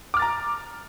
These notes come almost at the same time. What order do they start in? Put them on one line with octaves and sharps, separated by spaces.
D6 F6 A6 A#5